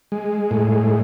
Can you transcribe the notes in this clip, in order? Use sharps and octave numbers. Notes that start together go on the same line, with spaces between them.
G#3
A2